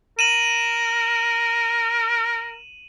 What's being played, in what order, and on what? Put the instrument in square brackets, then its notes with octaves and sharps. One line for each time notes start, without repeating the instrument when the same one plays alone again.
[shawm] A#4 [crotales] D#7 E7 F#7